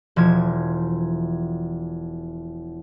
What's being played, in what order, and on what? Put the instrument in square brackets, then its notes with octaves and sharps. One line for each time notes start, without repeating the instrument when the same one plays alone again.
[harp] E1 F3 G#6